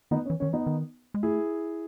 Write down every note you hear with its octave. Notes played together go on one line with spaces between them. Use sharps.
D#3 B3 D#4
C#4
E3
D#3 C#4
E3
B3 D#4
D#3
G#3
A3 E4 G#4